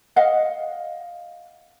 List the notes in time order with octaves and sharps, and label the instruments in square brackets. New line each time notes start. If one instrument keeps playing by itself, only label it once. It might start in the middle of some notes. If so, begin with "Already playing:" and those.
[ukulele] D#5 F5 F#5